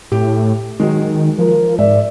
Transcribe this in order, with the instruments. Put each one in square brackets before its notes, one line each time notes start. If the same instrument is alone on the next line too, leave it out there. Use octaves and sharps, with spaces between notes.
[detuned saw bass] A2 [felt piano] G4
[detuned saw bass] D#3 [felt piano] F#3 G#3
[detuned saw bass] F3 [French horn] A#4
[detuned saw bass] G#2 [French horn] D5 [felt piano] E5